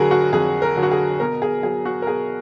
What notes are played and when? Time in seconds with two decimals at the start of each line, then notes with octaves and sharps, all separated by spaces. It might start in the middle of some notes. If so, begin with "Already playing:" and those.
Already playing: F2 D3 F#3 F#4 G#4 A#4
0.11 F#4
0.32 F2 G#4
0.62 A#4
0.77 D3 F#3
0.83 F#4
0.91 G#4
1.20 B2 A#4
1.42 G#4
1.63 F#3 G#4
1.85 F#4
2.02 A#4
2.07 B2 G#4